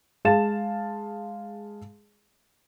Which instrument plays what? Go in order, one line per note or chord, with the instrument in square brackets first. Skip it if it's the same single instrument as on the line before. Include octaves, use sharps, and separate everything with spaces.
[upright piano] G#3 G#4 F5 A5 A6 E7